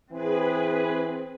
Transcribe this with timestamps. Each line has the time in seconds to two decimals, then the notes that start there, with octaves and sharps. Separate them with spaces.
0.12 E3 C4 G#4 B4